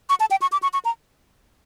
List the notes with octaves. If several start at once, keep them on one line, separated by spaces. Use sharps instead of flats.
C#6
A5
G5
C#6
D6
C#6
C#6
A#5